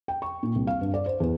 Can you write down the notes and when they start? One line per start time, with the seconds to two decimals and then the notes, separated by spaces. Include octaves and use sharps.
0.08 G5
0.22 C#6
0.43 A#2
0.56 C2
0.67 F5
0.81 G2
0.94 D5
1.06 C5
1.20 E2